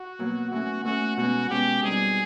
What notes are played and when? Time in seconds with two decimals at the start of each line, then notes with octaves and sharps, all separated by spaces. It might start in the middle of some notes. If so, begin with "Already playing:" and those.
Already playing: F#4
0.19 B2 F#3 A#3
0.52 E3 A3 C#4 F#4
0.85 E3 A3 C#4 F#4
1.17 B2 G#3 C#4 F#4
1.50 B2 G#3 C#4 G4
1.83 B2 G3 C4 D#4 G#4